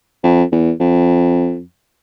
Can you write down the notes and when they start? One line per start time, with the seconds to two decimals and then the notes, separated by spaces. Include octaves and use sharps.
0.23 F2
0.52 E2
0.80 F2